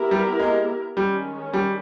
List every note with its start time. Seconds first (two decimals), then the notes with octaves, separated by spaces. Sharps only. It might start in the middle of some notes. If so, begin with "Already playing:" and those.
Already playing: B3 E4 G4 A#4
0.11 G3
0.39 G#3
0.96 D#3 G3 G#3 C#4
1.53 G3